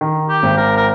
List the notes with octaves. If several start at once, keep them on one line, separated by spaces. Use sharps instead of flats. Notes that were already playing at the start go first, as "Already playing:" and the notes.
D#3
G4
G#1
A#4
A#4